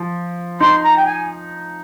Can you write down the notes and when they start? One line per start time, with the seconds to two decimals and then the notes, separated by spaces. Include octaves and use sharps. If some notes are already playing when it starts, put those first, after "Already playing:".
Already playing: F3
0.60 D#4 C6
0.83 A#5
0.97 G5
1.05 G#5